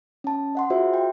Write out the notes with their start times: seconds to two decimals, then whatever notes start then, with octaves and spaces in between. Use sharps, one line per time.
0.24 C#4 A5
0.55 D#5 F#5 C6
0.70 F4 F#4 G#4 C5 E5
0.94 G5